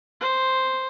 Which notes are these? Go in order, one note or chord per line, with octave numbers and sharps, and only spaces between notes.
C5